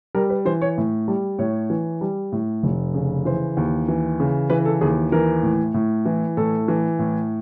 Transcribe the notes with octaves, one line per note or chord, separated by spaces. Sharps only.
G3 A#4
B4
E3 C5
C#5
A2
G3
A2 C#5
E3
G3
A2
F1
C#3
E3 C5
D#2
E3
C#3
E3 B4
A4
D#2 G#4
E3 A#4
A2
A2
E3
A2 A4
E3
A2